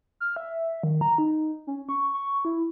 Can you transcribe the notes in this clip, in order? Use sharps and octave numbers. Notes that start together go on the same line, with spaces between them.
F6
E5
D#3
A#5
D#4
C#4
C#6
C#6
E4